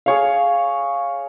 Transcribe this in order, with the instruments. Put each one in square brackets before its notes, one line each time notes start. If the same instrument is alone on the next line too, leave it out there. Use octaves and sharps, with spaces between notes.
[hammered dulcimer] G#4 C#5 F5